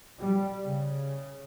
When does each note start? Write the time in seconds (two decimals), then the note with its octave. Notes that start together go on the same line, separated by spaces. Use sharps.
0.20 G3
0.64 C#3